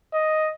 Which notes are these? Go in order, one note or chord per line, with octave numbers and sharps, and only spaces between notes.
D#5